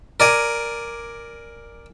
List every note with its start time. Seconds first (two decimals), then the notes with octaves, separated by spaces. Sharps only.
0.20 A#4 D5 G#5